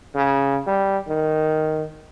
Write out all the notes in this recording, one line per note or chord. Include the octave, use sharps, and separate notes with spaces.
C#3
G3
D#3